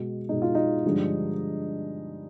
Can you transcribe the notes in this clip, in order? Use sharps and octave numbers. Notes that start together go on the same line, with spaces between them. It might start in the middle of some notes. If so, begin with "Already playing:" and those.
Already playing: B2 G#3
B2 G#3 D#4
F4
D#4
G2 D3 F3 G#3